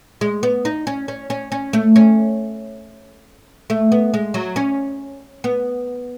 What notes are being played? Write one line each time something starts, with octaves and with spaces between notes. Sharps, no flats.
G#3
B3
D#4
C#4
C#4
C#4
C#4
A3
C#4
A3
B3
G#3
F#3
C#4
B3